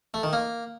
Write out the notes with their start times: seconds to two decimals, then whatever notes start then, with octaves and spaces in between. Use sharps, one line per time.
0.14 A3
0.23 D#3
0.33 A#3